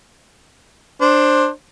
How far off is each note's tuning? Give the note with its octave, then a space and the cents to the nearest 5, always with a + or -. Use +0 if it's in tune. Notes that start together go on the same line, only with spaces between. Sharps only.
D4 +10 C5 +15